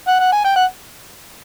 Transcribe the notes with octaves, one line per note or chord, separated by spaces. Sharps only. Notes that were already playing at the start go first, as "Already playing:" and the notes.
F#5
F#5
G#5
G5
F#5